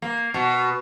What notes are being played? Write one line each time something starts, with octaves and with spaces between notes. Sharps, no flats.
A#3
B2